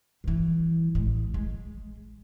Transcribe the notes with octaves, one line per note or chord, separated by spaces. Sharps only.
G2 E3
A1 G#3
G#3